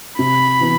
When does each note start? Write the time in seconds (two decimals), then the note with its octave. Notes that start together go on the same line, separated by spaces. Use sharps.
0.19 C3 B5
0.61 E3 B3